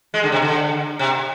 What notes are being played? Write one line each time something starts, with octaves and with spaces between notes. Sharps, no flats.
G#3
D3
C3
D3
C3